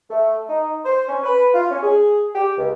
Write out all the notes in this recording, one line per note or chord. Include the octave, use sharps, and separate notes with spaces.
A3
D#4
C5
C#4
B4
F4
C#4
G#4
G4
C#2